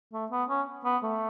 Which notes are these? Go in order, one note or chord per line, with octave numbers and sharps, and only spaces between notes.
A3
B3
C#4
B3
A3